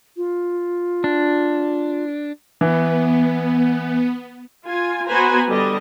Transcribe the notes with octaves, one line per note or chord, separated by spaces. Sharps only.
F4
D4
E3 B3
F4 G#5
B3 F#4 B4 C5 G#5 A#5
D3 G3 D#5